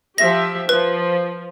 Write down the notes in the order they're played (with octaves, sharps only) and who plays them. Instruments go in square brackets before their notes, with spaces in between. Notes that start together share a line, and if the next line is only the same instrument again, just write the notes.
[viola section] F3 G4 E5 [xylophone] A#6
[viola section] F3 [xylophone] B4